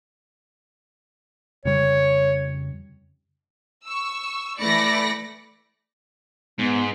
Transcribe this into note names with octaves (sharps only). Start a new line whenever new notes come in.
F2 C#3 G3 C#5
C#6 E6
E3 A3 D5 B5 A#6 C#7
G#2 B3